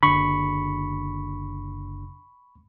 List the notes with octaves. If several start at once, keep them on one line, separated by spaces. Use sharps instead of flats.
F#1 D3 B5 C#6